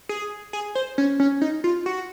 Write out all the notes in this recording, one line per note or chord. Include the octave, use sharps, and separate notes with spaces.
G#4
G#4
C5
C#4
C#4
D#4
F4
F#4